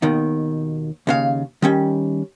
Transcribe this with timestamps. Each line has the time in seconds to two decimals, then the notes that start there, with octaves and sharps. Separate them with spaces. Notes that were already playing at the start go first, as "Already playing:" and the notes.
0.02 D#2 B2 D#3
1.07 D#2 C#3 F5
1.62 D#3 G3 C#4